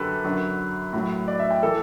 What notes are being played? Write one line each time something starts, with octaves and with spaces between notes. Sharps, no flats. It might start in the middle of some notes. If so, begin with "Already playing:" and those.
Already playing: F#2 D3 F#3 G4 A4 B4
F#2 D3 F#3
A2 F#3
D5
E5
G5
E3 A4